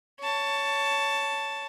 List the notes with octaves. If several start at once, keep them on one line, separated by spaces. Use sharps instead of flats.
C#5 A5